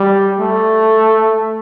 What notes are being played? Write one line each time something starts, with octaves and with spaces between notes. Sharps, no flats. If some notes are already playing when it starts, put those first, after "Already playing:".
Already playing: G3
A3